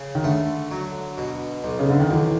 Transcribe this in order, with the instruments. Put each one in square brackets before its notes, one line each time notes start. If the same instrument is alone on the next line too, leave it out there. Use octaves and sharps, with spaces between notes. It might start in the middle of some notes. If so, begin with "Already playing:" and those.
Already playing: [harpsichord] C#3
[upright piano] D#3
[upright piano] D3 [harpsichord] A3
[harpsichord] F#3
B2
B1
[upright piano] C#3
D3
D#3
[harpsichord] B1 [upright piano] E3